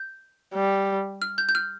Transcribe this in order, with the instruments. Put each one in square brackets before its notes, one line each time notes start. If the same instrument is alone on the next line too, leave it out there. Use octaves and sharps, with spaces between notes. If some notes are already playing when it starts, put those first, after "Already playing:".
Already playing: [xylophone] G6
[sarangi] G3
[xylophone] F6
G6
G6
F6